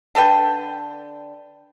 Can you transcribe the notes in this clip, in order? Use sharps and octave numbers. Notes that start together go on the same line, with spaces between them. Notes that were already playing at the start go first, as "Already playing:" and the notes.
D3 A4 B4 G5